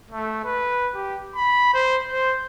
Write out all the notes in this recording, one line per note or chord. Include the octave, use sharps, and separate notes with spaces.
A3
B4
G4
B5
C5
C5